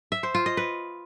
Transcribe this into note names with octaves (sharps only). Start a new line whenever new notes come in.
E5
C5
F4
D#5
B4